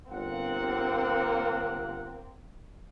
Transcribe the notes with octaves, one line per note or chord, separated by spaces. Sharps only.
G1 A#3 C4 F5 F#5